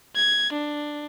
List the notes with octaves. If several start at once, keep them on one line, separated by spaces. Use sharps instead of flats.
G#6
D4